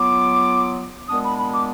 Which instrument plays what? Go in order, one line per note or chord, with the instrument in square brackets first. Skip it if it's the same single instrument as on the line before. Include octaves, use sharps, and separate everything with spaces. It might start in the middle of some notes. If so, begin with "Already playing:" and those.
Already playing: [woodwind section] F#3 B3 F4 D6
A#2 G#3 B3 D4 D#6
B5
B5
D6